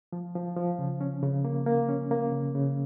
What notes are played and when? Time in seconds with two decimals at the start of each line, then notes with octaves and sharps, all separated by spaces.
0.12 F3
0.35 F3
0.57 F3
0.79 C#3
1.01 C#4
1.23 C#3
1.45 A#3
1.66 A#3
1.89 C#4
2.11 A#3
2.32 C#3
2.55 C#3